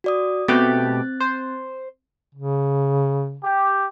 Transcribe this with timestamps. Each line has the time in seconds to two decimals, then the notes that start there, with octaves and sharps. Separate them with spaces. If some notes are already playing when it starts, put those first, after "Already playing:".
0.04 F#4 D5 D#6
0.48 B2 A3 C4 G4 F#6 A6
1.20 C5
2.35 C#3
3.44 G4